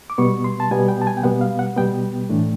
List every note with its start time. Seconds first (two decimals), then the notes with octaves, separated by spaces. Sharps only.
0.10 D6
0.18 B2 G3 B3 C#6
0.44 C6
0.60 A5
0.71 B2 G3 B3 G#5
0.88 G5
1.02 A5
1.07 G#5
1.17 G5
1.23 B2 G3 B3 F#5
1.41 F5
1.59 F#5
1.76 B2 G3 B3 G5
2.29 A2 E3 A3 D4